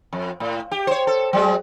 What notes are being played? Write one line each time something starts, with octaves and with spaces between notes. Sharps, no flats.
F2
A2
G4
C5 C#5
A4
F#3 G#3 C4